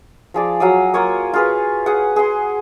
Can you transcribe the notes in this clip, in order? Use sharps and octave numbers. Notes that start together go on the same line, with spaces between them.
F3 G#4 D5
F#3 F5 D#6
A#3 F4 C#5 D#6
F4 G#4 B4
G#4 F#5
G#4 C6